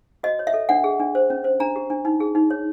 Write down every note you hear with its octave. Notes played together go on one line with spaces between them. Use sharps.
F#4 D#5
C#5
E5
A4
D4 F#5
G#4
D4
C5
C#4
C5
D4 A#5
G4
D4
D#4
G#4
D#4
C#5